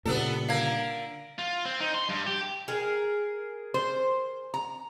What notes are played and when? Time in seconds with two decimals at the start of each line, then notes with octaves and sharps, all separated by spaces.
0.05 A#2 C#3 G3 B3 D4 A4
0.49 D3 A#4 F5 G#6
1.39 F4
1.65 C4
1.80 D#4
1.94 C6
2.09 G2
2.26 G4
2.68 G#4 A#4
3.74 C5
4.54 A#5